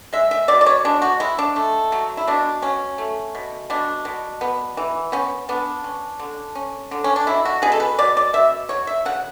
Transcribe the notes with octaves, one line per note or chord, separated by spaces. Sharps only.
G#3 E5
E5
B2 D5
D5
C#5
G#3 D4
F#4
G#3 E4
D4
A3
F#3
E4
B2 D4
F#3 C#4
A3
B2
B2 D4
B2
B3
E3
B3 C#4
B3 D4
C#4
D3
C#4
D3
C#4
D4
B2 E4
F#4
B2 G#4
A4
B4
B2 D5
D5
B2 E5
F#3 C#5
E5
C#3 F#5